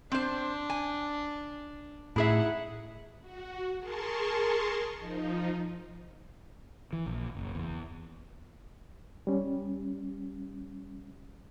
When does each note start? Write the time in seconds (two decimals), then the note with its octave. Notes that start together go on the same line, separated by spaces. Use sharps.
0.12 C4 D4 C5
0.70 G#5
2.16 A2 D#4 E4 G#4 E5 F#5
3.21 F#4
3.78 G#4 A#4 A5 C6 C#6
4.97 F3 D#4
6.93 E3
7.06 A#1
7.35 F#1
7.55 E2
9.27 G3 C#4